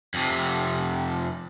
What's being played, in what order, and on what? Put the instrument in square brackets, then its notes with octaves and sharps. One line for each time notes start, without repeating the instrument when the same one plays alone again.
[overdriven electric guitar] F2 C3